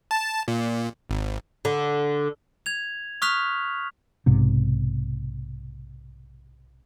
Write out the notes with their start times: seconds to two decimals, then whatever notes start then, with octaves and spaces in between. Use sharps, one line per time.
0.11 A5
0.48 A#2
1.10 G#1
1.65 D3
2.66 G#6 F7
3.22 C#6 D#6 F6 F#6 B6 F7
4.26 B1 G#2 C3